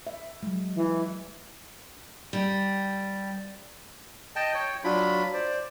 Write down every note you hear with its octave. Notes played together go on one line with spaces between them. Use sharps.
E5
F#3 G#3
E3
G3
D#5 G5 A5
C#5 G5
F#3 D4 F4 B5
C5 D5